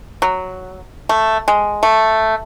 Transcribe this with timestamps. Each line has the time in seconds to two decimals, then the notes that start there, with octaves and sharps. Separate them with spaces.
0.22 F#3
1.09 A3
1.48 G#3
1.83 A3